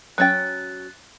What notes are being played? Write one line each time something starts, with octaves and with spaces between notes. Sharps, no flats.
F#3 C#4 G5 F#6 A6